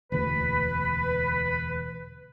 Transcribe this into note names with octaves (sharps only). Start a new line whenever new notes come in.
E1 D2 B4